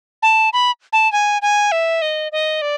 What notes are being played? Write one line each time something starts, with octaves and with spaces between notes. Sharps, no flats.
A5
B5
A5
G#5
G#5
E5
D#5
D#5
D5